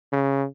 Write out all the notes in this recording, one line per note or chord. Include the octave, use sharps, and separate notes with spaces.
C#3